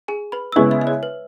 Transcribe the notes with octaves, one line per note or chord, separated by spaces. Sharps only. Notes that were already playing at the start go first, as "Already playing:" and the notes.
G#4 G#5
B4 B5
E6
C#3 G#3 B3 E4 C#5 C#6
E5
E5
C#5
B4